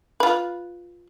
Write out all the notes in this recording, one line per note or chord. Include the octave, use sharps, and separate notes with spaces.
F4 B4